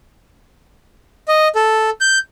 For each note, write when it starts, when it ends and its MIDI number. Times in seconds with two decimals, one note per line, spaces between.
1.28 1.48 75
1.55 1.90 69
2.01 2.19 91